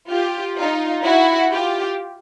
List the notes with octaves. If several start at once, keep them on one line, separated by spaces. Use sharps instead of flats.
F4 G4
D#4 F4
E4 F#4
F4 G4